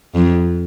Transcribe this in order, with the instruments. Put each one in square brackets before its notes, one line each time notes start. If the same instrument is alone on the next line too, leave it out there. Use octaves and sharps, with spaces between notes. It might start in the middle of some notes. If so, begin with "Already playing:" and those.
[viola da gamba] F2